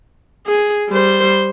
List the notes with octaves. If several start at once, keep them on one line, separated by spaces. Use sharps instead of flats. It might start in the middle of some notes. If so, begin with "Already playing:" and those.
G#4
G3 C5